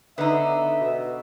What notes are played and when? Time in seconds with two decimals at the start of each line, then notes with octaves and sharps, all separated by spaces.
0.18 D3 B3 D#4 E5
0.81 B2